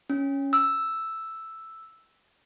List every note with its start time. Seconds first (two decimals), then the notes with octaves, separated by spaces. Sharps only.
0.10 C#4
0.53 E6